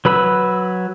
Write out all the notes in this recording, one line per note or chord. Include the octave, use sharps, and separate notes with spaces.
F#3 B4 B5 E6